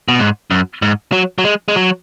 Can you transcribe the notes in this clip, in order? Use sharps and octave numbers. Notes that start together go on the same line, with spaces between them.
B2
G#2
F#2
G#2
F#3
F#3
G#3
G#3
F#3